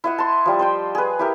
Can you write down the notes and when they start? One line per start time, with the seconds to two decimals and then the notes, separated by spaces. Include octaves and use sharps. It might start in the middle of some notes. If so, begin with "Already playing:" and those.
0.04 E4 D#5 F#5
0.18 A5 C6
0.45 F3 G3
0.59 C5 D#5 G5
0.95 G#4 B4
1.19 E4 G4 A#4